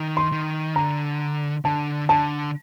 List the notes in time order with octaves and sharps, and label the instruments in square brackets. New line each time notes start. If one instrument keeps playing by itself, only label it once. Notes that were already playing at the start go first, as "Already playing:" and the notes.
Already playing: [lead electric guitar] D#3
[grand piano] C6
[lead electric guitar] D#3
[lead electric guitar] D3 [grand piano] A#5
[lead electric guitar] D3 [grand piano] A5
[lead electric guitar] D3 [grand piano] A5